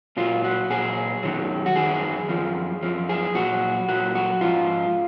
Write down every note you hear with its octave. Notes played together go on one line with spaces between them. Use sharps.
A#2 F#3 F4
F#4
A#2 F#3 G#4
F#2 D#3 F#3
F#4
F#2 D#3 F#3 G#4
F#2 F3
F#2 F3
G#4
A#2 F#3 F#4
A#2 F#3 F#4
F#4
G#2 F3 F4